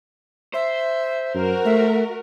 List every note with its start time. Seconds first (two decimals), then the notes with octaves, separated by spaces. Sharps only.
0.54 C5 E5
1.35 F#2 F#4 A#4
1.65 A3 E5